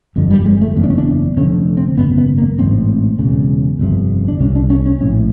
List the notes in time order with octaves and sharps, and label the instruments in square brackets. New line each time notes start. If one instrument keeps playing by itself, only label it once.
[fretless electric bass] G1 F2 D3
G3
G#3
A3
F#1 E2 C#3
D4
C#4
D4
F1 F2 D3 C#4
C4
G#1 F#2 C#3 B3
B3
A#3
A1 G#2 C4
E1 E2 C#3
G1 F2 C3
D4
C2 C3 C#4
D4
C#4
C#4
A#1 A2 C#4